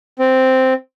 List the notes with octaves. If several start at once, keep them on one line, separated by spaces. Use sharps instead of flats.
C4